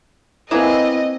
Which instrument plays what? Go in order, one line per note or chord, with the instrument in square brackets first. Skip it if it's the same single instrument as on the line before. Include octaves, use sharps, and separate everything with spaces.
[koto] A#3 G#4 A#5 [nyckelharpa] C4 [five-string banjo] E4 B4 [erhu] D#5